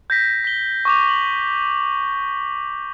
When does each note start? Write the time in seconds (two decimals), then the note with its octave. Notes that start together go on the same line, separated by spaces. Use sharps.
0.10 G6 A#6 B6
0.44 B6 G7
0.85 C#6 D6 F7
1.09 F#7